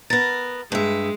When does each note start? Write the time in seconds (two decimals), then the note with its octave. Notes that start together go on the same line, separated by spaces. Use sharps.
0.10 B3 A#4 A6
0.72 G2 G#3 E5